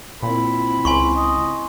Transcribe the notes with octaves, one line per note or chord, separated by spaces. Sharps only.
A#2 C4 E4 B5
C#2 G#5 C6 C#6
D#5